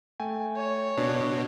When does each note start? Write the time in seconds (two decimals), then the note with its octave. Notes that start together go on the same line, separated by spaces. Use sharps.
0.20 A3 G5 G#5
0.56 C#5
0.97 B2 D4